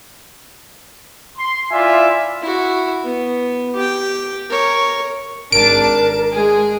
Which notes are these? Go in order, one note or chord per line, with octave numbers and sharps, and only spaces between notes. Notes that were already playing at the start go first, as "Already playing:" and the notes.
C6
E4 F4 D5 E5 G#5
E4 F#4
B3
G4 G5
A#4 C#5
G#1 D4 A#4 A5 D7
G#3 G#4